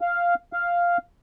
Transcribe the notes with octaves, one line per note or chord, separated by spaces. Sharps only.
F5
F5